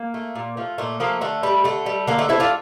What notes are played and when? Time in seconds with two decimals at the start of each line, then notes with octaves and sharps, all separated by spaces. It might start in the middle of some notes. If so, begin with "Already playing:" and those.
Already playing: A#3
0.14 A3
0.35 A#2
0.57 F3 A3
0.78 A#2 A3
1.00 F3 A3 A#3
1.21 D3 A3
1.43 G3
1.64 D3 A3
1.86 G3
2.07 D3 A#3
2.19 A3
2.29 A3 C4 E4
2.40 D4 F4